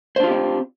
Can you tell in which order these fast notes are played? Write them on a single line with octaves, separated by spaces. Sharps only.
C5 D4 F4 G4 C4